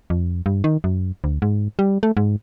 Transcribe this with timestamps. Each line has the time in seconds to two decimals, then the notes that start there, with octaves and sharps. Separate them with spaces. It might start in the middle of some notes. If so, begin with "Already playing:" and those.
0.10 F2
0.46 G2
0.64 D#3
0.84 F#2
1.24 D2
1.42 G#2
1.79 G3
2.03 A3
2.17 G#2